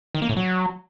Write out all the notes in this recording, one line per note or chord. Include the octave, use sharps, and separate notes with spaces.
D#3
A#3
A2
F#3